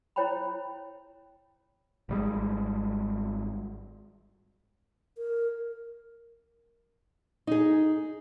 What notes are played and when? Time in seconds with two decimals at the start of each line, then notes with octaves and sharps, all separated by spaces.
0.16 E4 C5 C#5 G5 A#5 B5
2.09 G#1 G3 G#3
5.18 A#4
7.47 D#4 G#4